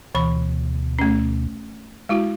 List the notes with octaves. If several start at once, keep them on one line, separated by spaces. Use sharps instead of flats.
D2 B2 E3 B5
A3 C#4
G#3 E4 F#4